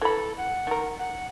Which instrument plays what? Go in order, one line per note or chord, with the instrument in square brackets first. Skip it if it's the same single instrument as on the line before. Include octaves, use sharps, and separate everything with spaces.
[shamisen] E3 B5 [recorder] A4
[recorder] F#5
[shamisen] D#3 A#4
[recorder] F#5